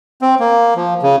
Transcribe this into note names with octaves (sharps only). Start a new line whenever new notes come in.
C4
A#3
F3
C#3